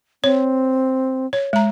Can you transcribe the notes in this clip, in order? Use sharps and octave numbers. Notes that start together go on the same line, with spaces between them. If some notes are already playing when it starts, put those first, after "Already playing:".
C4 C#5
C#5
G#3 A#5